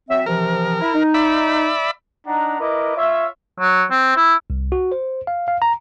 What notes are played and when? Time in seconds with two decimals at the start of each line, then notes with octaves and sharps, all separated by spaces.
0.09 F#3 C4 E5
0.26 C3 E3 F3 A#4
0.80 E4
0.94 D#4
1.14 D5 E5 B5
2.26 D4 D#4 F#5 A#5
2.59 E4 A#4 B4 D#5 D6
2.96 F4 C#5 E5
3.60 F#3
3.91 C4
4.16 E4
4.50 C2
4.72 F#4
4.92 C5
5.27 F5
5.48 F5
5.62 A#5